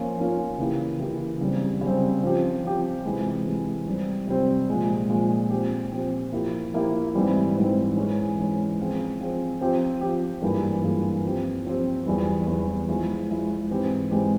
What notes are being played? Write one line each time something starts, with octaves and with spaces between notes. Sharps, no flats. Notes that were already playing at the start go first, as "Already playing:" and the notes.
Already playing: F3 A#3 C#4 F4
F3 A#3 C#4 F4
C#3 E3 A#3 E4 G4
C#3 E3 A#3 E4 G4
C#3 G3 C4
C#3 G3 C4
F3 C4 G4
F3 C4 G4
C3 E3 G#3
C3 E3 G#3
C3 G3 C4
C3 G3 C4
A#2 F3 G#3
A#2 F3 G#3
F3 C4 G4
F3 C4 G4
F3 A#3 E4 G4
F3 A#3 E4 G4
G#2 E3 G3 C4
G#2 E3 G3 C4
E3 G#3 C#4
E3 G#3 C#4
F3 C4 F4 G#4
F3 C4 F4 G#4
F3 C4 G4
F3 C4 G4
G2 E3 A#3 F4 G#4
G2 E3 A#3 F4 G#4
F3 C4 G4
F3 C4 G4
E2 E3 G3
E2 E3 G3
F3 G#3 E4
F3 G#3 E4
G#2 E3 G#3 C4 G4
G#2 E3 G#3 C4 G4